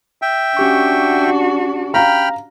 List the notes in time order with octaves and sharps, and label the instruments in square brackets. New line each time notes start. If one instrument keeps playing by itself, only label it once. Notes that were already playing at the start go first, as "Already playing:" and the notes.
[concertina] E5 G5
[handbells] C#4 G4 C#6 [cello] D4 F#4
[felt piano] F5 A#5 [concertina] G5 B5 F6